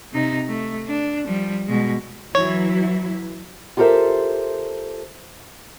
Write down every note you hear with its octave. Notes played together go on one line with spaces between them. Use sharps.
C3 D#4
A3
D4
F3 G3
B2 G#3
E3 F#3 E4 C#5
F4 G4 A4 A#4 C5 E5